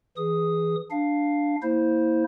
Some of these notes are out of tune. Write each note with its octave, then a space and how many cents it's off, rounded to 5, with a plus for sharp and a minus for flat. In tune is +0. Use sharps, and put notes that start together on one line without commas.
E3 +0 G#4 +0 D#6 +0
D4 +0 F5 +0
A#3 +0 E4 -20 C5 +0